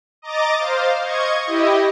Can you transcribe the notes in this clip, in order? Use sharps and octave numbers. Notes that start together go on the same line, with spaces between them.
D#5 A#5 D6 A6
C5 F5
D#5 C#6 G#6
E4 G4 D#5